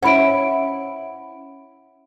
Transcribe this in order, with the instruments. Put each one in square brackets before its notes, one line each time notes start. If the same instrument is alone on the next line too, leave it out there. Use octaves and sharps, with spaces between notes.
[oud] C#4 E4 [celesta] F#5 B5 D7